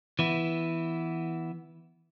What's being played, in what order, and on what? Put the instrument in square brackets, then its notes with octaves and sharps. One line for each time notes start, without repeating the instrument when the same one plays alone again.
[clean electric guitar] E3 B3 E4